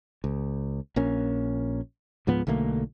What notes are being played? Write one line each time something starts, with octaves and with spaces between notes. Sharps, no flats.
C#2
A#1 A#3 C#4
C#2 G#2 F3 B3
B1 D3 A3 A#3